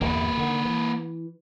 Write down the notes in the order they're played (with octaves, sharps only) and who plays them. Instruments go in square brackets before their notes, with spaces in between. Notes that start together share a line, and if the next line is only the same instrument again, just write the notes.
[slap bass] G1 E2 A2 [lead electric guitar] A#3 B4
[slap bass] D3 D#3
E3